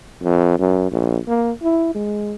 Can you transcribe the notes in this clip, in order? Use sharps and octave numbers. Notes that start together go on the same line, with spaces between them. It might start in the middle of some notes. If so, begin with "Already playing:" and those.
F2
F#2
A#1
A#3
E4
G#3